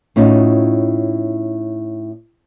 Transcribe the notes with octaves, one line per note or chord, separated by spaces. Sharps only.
A2 C#4 D#4 F4